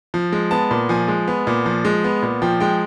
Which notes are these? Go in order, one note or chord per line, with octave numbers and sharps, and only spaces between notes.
F3
G#3
B3 A5
A#2
F3 G#5
G#3
B3
A#2
F3
G#3
B3
A#2
F3 G5
G#3 G5